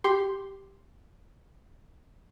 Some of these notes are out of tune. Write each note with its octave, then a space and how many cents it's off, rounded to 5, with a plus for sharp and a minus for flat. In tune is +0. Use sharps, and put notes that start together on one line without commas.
G4 +0 C6 +0